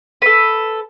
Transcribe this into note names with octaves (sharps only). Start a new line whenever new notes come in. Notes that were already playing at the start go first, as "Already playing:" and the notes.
A4 B4